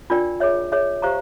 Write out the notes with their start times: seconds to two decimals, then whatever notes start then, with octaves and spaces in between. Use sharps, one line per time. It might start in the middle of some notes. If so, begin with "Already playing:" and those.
0.10 D4 F4 A#4 D5 G5
0.40 G#4 C#5 E5
0.72 G#4 C#5 E5
1.02 G4 C5 F5 A#5 C#6